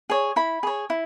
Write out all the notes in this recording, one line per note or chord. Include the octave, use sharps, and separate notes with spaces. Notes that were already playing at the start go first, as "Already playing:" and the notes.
G#4 C#5
E4 B5
G#4 C#5
E4